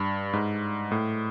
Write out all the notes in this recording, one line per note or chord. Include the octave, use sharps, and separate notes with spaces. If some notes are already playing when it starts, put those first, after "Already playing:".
Already playing: G2
G#2
A2